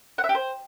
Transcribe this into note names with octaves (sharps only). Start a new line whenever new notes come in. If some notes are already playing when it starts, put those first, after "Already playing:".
F#5
E5
G4
C5